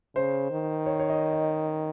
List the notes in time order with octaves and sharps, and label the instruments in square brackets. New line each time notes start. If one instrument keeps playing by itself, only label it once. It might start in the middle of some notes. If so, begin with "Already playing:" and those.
[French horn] C#3 [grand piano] C5
[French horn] D#3
[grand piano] C#5
C#5
D#5
D#5